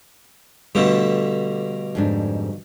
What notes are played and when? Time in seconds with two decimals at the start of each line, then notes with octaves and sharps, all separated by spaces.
0.75 G2 B2 D3 A3
1.95 F2 G#2 D4